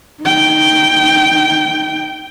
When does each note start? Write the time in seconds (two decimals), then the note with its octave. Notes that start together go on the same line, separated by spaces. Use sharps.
0.22 D#4 G5